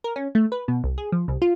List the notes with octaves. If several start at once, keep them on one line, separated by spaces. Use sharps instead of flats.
A#4
C#4
A3
B4
B2
C2
G#4
F3
C2
F4